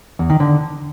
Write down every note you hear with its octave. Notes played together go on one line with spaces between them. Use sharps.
E2
D#3
D3